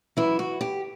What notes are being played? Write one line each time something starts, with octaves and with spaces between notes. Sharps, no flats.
F#2 E3 E4
F#4
G4